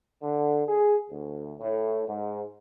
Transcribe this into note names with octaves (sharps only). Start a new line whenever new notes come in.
D3
G#4
D2
A2
G#2